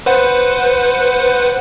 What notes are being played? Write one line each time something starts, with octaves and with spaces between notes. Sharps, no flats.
B4 C5 F#5